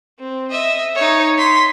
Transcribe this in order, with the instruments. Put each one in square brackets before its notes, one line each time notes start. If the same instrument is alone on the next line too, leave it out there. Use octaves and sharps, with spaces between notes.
[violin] C4
D#5 E5
D#4 C#5
C6 B6